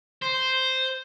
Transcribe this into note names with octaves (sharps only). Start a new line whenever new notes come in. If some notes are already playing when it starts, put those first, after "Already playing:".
C5